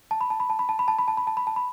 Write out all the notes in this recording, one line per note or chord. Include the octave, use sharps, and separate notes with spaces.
A5
B5
A5
B5
A5
B5
A5
B5
A5
B5
A5
B5
A5
B5
A5
B5